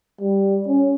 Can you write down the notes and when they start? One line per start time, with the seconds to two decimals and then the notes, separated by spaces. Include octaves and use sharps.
0.21 G3
0.67 C#4